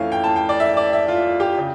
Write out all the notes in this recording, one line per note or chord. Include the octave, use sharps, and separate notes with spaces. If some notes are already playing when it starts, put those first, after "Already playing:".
Already playing: F2 E3 A3 C#4 F5
G5
A5
G5
D5
E5
D5
E5
F4
G4
C#3